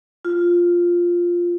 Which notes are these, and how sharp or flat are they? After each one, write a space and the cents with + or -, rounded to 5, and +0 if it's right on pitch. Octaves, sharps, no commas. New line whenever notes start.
F4 +0